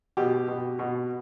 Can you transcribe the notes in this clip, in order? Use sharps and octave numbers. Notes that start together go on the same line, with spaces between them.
B2 G4
B2
B2